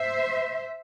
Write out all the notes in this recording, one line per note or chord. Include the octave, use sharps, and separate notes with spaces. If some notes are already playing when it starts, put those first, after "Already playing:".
Already playing: C5 E5